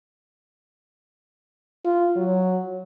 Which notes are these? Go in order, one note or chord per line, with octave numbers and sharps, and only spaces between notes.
F4
F#3